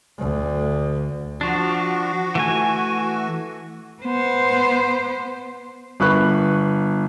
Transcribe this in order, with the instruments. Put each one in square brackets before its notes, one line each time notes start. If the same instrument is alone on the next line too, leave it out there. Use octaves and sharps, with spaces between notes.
[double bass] D2
[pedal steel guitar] F3 D4 [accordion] F#4
[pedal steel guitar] E3 A3 G#5
[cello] B3 C5
[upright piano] G1 B4 C#6 F#6